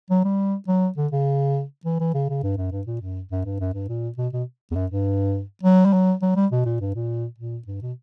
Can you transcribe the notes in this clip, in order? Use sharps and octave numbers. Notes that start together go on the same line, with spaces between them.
F#3
G3
F#3
D3
C#3
E3
E3
C#3
C#3
G2
F#2
G2
A#2
F#2
F#2
G2
F#2
G2
A#2
B2
B2
E2
F#2
G2
F#3
G3
F#3
F#3
G3
B2
A#2
G2
A#2
A#2
G2
B2